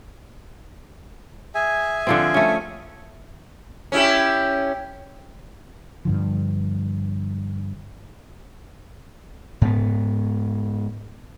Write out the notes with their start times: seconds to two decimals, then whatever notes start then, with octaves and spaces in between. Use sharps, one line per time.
1.55 G#4 E5 G#5
2.07 D3 F3 C4
2.34 A3 C#4
3.92 C#4 E4 G4
6.05 G2 D3 F3
9.61 G#2 B3